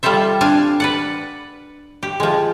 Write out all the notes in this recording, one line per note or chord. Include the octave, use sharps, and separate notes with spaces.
G3 F4 A4 C5 E5
C4 D4 F5 G#5
B4 D5 F#5
G4
F3 G#3